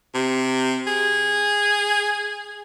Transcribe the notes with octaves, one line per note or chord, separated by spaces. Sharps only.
C3
G#4